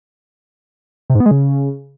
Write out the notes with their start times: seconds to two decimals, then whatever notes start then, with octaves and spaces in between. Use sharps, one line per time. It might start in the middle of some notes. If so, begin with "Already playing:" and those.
1.10 C3
1.15 G#2
1.20 B3
1.26 G#3
1.31 C#3